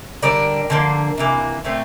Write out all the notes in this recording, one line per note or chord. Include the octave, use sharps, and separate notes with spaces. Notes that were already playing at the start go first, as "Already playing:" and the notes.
D3 G3 D4 A#4 D5
D3 F3 A#3
C3 E3 A#3
A#2 A3 C4